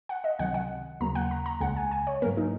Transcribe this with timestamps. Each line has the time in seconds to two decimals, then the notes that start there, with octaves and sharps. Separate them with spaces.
0.09 F#5
0.24 D#5
0.39 C#2 C3 D#3 F#3 F#5
0.54 F#5
1.00 D#2 C#3 F#3 A#3 A#5
1.15 F#5
1.31 A#5
1.46 A#5
1.61 C#2 C#3 G#3 F#5
1.76 G#5
1.91 G#5
2.07 C#5
2.22 G#2 F#3 A#3 A#4
2.37 D#4